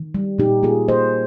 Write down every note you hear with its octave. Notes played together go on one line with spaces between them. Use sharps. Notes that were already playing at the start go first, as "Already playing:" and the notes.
Already playing: D#3
G3
A#2 D#4 G4
A#3 F4 G#4
A#3 C5 D#5